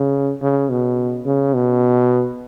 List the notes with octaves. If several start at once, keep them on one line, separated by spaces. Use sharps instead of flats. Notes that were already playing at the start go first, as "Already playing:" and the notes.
Already playing: C#3
C#3
B2
C#3
B2